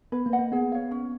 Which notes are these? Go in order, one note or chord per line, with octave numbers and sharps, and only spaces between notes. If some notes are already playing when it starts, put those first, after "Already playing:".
B3 B4
A#3
D#5 F#5
A#3
B3 G#4
C#5 F5
C#4